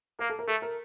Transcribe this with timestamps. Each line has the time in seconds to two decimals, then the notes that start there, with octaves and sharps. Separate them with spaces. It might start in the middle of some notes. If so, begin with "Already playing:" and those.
0.19 A#3 A#4
0.30 A4
0.39 A#4
0.48 A3 A4
0.62 A#4